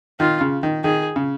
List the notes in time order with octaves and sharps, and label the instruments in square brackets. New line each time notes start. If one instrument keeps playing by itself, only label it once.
[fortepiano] D#3 [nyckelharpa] F4
[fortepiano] C#3
D#3
[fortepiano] D#3 [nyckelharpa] G#4
[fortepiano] C#3